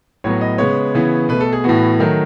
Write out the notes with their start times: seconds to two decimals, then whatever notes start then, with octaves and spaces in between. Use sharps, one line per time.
0.24 A2 F#3 B3 C#5
0.41 D#5
0.58 C#3 G#3 B3 C#5
0.94 C#3 E3 B3
1.29 B2 A3 B4
1.40 A4
1.53 G#4
1.64 A2 E3 B3 F#4
1.99 D#3 F#3 A3